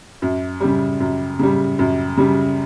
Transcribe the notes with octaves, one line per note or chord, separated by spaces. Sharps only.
F#2
C#3 G3
F#2
C#3 G3
F#2
C#3 G3